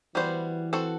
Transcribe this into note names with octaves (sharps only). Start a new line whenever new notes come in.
E3 G3 B3 F#4 C5
C4 F#4 A4